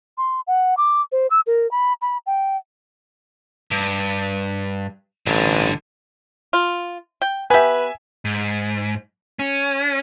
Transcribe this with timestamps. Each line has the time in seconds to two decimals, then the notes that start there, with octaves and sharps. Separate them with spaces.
0.18 C6
0.47 F#5
0.77 D6
1.12 C5
1.31 E6
1.47 A#4
1.71 B5
2.02 B5
2.26 G5
3.71 G2
5.26 A1 G2 D3
6.53 F4
7.22 G5
7.50 B3 G4 B4 E5 G#5
8.25 G#2
9.39 C#4